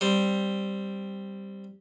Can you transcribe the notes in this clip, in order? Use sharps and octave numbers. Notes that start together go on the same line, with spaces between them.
G3 C4